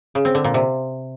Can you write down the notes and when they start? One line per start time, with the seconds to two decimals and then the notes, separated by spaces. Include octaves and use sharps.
0.15 C#3
0.25 C4
0.35 D3
0.44 A#2
0.54 C3